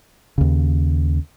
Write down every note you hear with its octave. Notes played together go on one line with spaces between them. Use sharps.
D#2 C#3